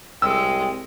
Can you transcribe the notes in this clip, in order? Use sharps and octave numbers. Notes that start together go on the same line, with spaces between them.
C2 G#3 G5 E6